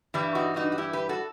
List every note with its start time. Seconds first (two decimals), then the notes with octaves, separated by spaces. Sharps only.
0.14 G2 E3 G3 E4
0.35 D#4 F#4
0.56 D#4 F#4
0.72 F#4
0.78 E4 G4
0.93 G4 B4
1.09 F#4 A4